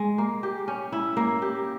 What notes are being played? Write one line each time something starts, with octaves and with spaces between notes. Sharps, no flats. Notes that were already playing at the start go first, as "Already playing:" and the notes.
Already playing: G#3
A#3
G4
C#4
E4
A#3
G4